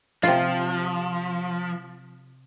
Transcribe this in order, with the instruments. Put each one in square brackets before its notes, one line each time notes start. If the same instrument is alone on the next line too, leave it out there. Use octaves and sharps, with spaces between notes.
[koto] C3 F4 [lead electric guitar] F3